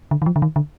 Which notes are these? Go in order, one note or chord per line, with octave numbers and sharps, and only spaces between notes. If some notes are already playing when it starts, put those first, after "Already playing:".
D3
D#3
F3
D3
D#3
D3